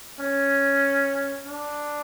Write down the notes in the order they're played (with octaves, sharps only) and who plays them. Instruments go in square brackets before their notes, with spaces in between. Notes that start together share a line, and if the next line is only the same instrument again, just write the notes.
[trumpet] C#4
D4